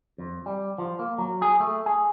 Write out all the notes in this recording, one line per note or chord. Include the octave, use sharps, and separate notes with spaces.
F2
G3
F3
A#3
F#3
G#4
A3
G#4